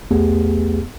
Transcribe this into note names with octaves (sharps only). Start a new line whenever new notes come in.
B1 E2 A3 B3 G4 G#4